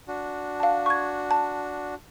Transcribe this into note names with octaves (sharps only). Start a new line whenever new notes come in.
D4 F#4
F5 A5
C#6 G#6
A5